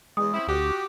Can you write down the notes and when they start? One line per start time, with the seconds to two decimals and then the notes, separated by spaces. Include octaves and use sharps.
0.17 E2 G#3 D#6
0.33 C4 C#4 E4
0.48 D2 F#4 G4